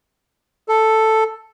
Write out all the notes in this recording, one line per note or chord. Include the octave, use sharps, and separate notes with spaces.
A4